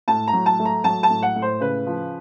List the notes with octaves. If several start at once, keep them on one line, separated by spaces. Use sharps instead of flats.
A2 A5
A#5
F#3
A5
A3
A#5
F#3 A5
A5
A2
F#5
A2
C5
C#3 B4
F3